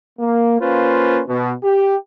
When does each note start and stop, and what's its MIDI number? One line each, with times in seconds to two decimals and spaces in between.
0.19 0.58 58
0.61 1.22 58
0.61 1.22 61
0.61 1.22 65
0.61 1.22 71
0.61 1.22 72
1.28 1.54 47
1.64 1.96 67